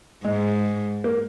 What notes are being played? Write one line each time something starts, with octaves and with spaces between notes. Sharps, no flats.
G#2 G#3
A#3